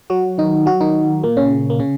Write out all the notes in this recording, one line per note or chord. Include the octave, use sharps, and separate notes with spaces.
F#3 F#4
D#3 D#4
F#3 F#4
D#3 D#4
A#2 A#3
C#3 C#4
A#3
C#3 C#4